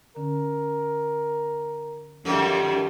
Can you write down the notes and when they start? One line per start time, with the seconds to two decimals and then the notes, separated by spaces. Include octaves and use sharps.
0.16 D3 C#4 A#4
2.25 F#2 D#3 F3 G3 A4